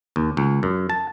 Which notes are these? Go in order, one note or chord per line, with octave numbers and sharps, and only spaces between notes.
D#2
C#2
F#2
A5